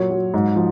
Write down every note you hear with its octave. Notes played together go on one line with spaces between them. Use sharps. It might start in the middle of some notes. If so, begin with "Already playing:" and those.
Already playing: A#2 F#3 C#5
F#3
G#2
F3